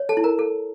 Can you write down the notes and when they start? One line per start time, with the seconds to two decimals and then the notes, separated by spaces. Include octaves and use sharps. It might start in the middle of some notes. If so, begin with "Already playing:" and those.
Already playing: C#5
0.09 A4 A5
0.17 E4
0.24 A#4 A#5
0.39 A4